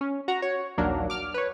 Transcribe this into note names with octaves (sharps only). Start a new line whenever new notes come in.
C#4
F#4 F#5 A#5
C#5
A#1 D#2 F#3 A#3 D4 A#4
D6 F6
B4 C#5